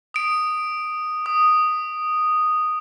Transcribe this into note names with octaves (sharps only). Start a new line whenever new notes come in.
D#6 D7
D#6